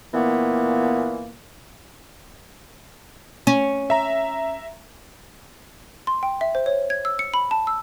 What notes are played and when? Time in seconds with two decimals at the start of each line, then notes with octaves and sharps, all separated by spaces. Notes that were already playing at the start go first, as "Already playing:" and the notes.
0.14 A#2 E3 A#3 B3
3.47 C#4
3.90 E5 A#5
6.07 C6
6.23 G5
6.41 E5
6.55 C5
6.66 C#5
6.90 G#6
7.05 E6
7.19 C#7
7.34 B5
7.51 A5
7.67 E6